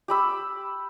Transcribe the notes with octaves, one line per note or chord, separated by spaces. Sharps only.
G4 B5 E6